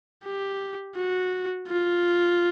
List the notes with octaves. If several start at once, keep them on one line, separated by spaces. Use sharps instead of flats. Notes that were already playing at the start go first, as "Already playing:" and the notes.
G4
F#4
F4